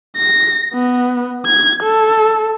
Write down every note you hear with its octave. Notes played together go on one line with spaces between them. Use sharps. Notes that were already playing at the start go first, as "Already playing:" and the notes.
A#6
B3
G#6
A4